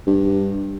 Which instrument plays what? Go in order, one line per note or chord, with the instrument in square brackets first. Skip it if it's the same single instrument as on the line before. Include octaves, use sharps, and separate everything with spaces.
[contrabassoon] G2